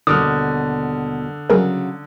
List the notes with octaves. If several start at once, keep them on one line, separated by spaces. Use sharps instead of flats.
D#2 B2 D3 G3 D6 D#6 F6
C#3 F#3 G3 G#4 A#4